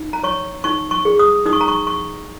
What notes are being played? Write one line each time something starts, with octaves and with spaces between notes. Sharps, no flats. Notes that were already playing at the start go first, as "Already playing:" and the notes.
Already playing: D#4
A#5
C#5 C#6
D#4 C#6
C#6
G#4
D#6
D#4 D#6
C#6
A#5
C#6
C#6